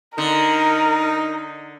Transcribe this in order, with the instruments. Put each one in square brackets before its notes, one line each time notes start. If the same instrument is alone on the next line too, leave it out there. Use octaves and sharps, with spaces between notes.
[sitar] D3 [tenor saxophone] D#4 [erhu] A#4